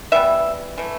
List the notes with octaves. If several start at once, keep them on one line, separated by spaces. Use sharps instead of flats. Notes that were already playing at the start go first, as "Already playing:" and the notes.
E3 G3 B3 E5
E3 A3